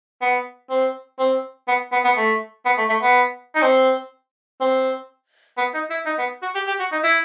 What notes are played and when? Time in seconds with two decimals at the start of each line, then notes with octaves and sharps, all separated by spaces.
0.22 B3
0.70 C4
1.19 C4
1.68 B3
1.92 B3
2.05 B3
2.17 A3
2.66 B3
2.78 A3
2.89 A3
3.02 B3
3.55 D#4
3.62 C4
4.61 C4
5.57 B3
5.74 D#4
5.90 E4
6.06 D#4
6.18 B3
6.42 F#4
6.55 G4
6.67 G4
6.80 F#4
6.92 D#4
7.04 E4